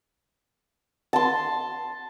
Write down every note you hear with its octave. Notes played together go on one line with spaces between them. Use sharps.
A5 C6